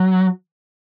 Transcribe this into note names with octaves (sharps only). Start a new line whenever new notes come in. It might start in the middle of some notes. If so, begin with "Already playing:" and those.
Already playing: F#3